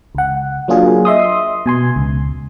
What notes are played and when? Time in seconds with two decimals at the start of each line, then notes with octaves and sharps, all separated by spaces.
0.15 C#2 F#5
0.68 F#3 A#3 D4 F4 G#4
1.05 D#5 E5 C6 D#6
1.66 B2 G#5 C6
1.96 C#2